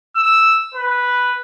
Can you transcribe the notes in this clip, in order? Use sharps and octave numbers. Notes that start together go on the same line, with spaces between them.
E6
B4